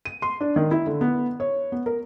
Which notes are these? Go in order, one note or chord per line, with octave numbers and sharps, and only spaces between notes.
D#7
C6
D4
D#3
E4
D3
B3
C#5
B3
A#4